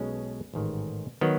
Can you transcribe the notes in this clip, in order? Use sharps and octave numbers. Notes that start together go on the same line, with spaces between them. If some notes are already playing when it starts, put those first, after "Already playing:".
Already playing: B1 B2 G#3 C#4
A1 G#2 D#3
D#3 F#3 B3